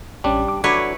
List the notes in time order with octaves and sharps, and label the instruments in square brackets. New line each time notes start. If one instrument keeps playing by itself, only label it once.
[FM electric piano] A1 C#4 [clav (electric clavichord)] G3 D4
[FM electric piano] D6
[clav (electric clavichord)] D3 F#3 [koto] E4 B4 C#5